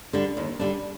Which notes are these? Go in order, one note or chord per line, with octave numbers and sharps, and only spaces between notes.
D3 G3 D4
D#2
D3 G3 D4